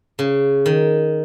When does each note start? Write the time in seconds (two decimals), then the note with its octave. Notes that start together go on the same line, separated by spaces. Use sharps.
0.19 C#3
0.66 D#3